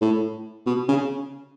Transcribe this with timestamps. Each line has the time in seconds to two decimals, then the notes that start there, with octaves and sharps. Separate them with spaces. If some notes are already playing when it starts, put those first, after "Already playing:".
0.01 A2
0.66 B2
0.88 C#3